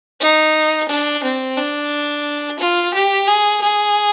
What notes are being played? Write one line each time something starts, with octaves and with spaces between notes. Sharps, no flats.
D#4
D4
C4
D4
F4
G4
G#4
G#4